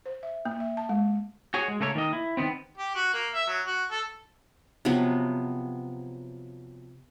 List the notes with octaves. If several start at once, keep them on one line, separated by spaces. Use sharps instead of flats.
C5
E5
A#3
E5
A5
G#3
F#4 G#4 C#5
G#3
C#3 A3 A#3 A4 C#5
D#3 A#3 D#5
E4
D#3 B3 C4
G4
F#4
A#3
E5
F#3
F#4
A4
C3 F3 F#3 B3